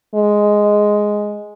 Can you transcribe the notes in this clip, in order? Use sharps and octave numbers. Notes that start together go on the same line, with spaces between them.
G#3